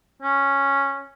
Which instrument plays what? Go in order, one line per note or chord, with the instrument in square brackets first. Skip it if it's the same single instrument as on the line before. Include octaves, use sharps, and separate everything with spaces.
[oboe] C#4